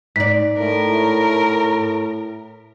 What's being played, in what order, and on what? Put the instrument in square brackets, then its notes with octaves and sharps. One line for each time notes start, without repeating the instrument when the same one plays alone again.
[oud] G#2 D5 [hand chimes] B6
[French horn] A2 [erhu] A#4